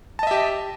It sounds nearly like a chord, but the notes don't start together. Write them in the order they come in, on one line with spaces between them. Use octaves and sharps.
A5 D#5 E5 G4